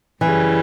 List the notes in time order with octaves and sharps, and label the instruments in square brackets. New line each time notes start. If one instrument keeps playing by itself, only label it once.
[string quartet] F#2 C#3 G3 [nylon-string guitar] E3